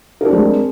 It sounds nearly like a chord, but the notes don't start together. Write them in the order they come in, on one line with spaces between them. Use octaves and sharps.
A#4 D4 C4 G#3